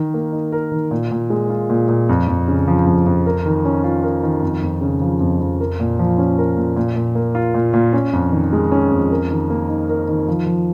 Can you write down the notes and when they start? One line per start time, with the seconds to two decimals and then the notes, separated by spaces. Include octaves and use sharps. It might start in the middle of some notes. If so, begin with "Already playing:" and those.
Already playing: D#3 A#4
0.14 A#3
0.32 D#4
0.52 A#4
0.72 D#3
0.91 A#2
1.11 A#2
1.30 G#3
1.49 F4
1.70 A#2
1.89 A#2
2.09 F2
2.28 F2
2.48 C#3
2.68 F3
2.86 F2
3.06 F2
3.26 A#4
3.46 D#3
3.65 C#4
3.84 F4
4.03 A#4
4.23 D#3
4.43 F2
4.62 F2
4.81 C#3
5.01 F3
5.21 F2
5.40 F2
5.60 A#4
5.80 A#2
5.99 F3
6.18 C#4
6.38 A#4
6.57 A#2
6.76 A#2
6.96 A#2
7.15 A#3
7.35 F4
7.54 A#2
7.74 A#2
7.93 C#4
8.13 F2
8.32 D#3
8.53 G#3
8.72 C#4
8.91 F2
9.11 A#4
9.31 D#3
9.50 A#3
9.69 D#4
9.89 A#4
10.09 D#3
10.28 F3
10.47 F3